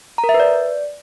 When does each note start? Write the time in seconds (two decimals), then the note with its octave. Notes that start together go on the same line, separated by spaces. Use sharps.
0.18 A#5
0.24 A#4
0.29 E5
0.34 B4
0.40 D5